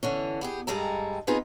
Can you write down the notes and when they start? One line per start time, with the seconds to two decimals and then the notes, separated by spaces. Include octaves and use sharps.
0.03 D3 E3 C#4
0.41 B3 G4 G#4
0.67 G2 G3 G#3 G#4 A4 A#5
1.27 B3 C4 D#4 F4 G#4 B4